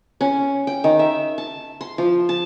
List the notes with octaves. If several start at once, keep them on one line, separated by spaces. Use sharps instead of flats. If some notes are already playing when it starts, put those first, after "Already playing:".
C#4
G5
D#3
E5
A5
C6
F3
A5